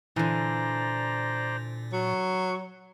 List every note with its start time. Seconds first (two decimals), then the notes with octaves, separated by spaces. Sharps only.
0.16 A#2 D3 E3 C5 D5 A#5
1.93 F#3 C#6